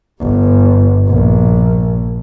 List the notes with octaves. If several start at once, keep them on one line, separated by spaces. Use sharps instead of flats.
G1
A#1